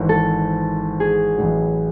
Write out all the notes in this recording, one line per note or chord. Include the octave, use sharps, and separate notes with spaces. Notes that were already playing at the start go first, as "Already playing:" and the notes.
Already playing: G#1 G#2 E3
A4
G#4
A1 A2 F#3